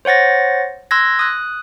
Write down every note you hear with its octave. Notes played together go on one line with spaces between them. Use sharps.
C5 C#5 F#5 A6 A#6
C6 E6 F#6 G#6 A#6
D#6 F#6